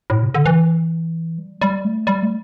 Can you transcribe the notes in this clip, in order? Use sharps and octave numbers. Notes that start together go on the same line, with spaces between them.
A2
C3
D3
E3
G3
G3
A3
G3
A3